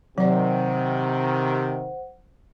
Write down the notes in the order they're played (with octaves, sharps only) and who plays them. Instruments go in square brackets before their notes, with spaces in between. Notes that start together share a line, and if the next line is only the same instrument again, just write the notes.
[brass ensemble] C3 D#3 [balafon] F#3 D5 [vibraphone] C5 F#5